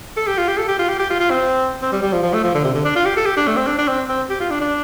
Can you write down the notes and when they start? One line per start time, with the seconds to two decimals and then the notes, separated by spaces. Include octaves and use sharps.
0.17 A4
0.27 G4
0.38 F4
0.48 G4
0.58 A4
0.68 G4
0.79 F4
0.89 G4
0.99 G4
1.10 F4
1.20 F4
1.30 C4
1.82 C4
1.92 G3
2.03 G3
2.13 F3
2.23 F3
2.33 A3
2.44 F3
2.55 D3
2.64 C3
2.75 D3
2.85 D4
2.96 F4
3.06 G4
3.17 A4
3.26 G4
3.37 D4
3.47 A3
3.57 C4
3.67 D4
3.78 D4
3.88 C4
4.09 C4
4.29 G4
4.40 F4
4.50 D4
4.60 D4